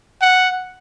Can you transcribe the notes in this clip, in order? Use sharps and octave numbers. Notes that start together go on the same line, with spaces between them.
F#5